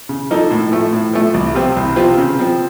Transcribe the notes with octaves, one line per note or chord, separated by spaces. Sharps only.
C#3
F3 A#3 D#4 A4
A2
F3 A3
A2
F3 A3
C2
C3 F3 C4 F4
C2
C3 F3 C4 F4
C#3
F3 C4